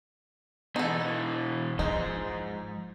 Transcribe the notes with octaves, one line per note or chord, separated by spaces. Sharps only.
B2 E3 D#4 A4
G#2 F3 D#4